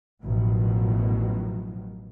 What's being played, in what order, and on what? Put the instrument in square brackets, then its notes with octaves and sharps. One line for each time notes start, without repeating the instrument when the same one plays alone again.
[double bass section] A1 F#2 B2 D#3 F3 F#3